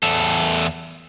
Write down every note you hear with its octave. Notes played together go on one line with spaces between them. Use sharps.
E2 A4